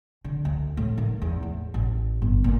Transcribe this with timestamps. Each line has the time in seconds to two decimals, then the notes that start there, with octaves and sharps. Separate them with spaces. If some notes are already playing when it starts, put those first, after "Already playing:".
0.24 D3
0.45 D2
0.77 A2
0.98 D#3
1.22 E2
1.43 A2
1.74 A1
2.22 G1
2.44 A#2